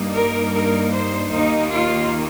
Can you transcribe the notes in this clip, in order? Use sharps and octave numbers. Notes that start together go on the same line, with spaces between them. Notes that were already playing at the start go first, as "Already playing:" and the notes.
Already playing: G2 G3 A#3 D#4
A#4
A#4
C5
D#2 D#3 A#3 D#4
F4